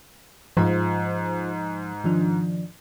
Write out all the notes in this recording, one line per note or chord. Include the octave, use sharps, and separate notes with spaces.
G#2 F3 F4 C5
D#3 F3 D4